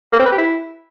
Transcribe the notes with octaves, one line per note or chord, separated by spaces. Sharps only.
A#3
C4
B4
G4
E4